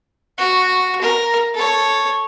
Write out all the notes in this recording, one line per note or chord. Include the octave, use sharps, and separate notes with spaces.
F#4
A#4
A4 C#5